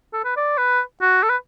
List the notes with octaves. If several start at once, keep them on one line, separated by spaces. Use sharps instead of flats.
A4
B4
D5
B4
F#4
A4
B4